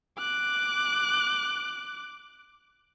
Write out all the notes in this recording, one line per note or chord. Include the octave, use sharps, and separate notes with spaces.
D6 F#6